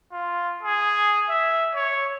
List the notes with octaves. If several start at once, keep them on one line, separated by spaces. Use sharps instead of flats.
F4
G#4
E5
C#5